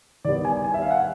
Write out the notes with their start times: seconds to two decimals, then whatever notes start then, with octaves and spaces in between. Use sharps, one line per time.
0.25 D#3 G3 B3 D5
0.45 G#5
0.64 G#5
0.74 E5
0.82 F5
0.90 F#5